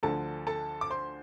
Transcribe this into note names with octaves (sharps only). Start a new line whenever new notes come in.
D2 D3 F3 A4 A5
A4 A5
D6
C5 C6